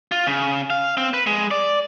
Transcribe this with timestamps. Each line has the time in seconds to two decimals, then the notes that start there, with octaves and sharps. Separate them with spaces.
0.12 F4
0.26 C#3
0.70 F5
0.97 C4
1.14 B4
1.26 G#3
1.51 D5